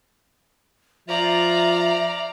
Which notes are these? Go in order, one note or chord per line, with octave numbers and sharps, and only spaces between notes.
F3 D5 E5 F5 A#5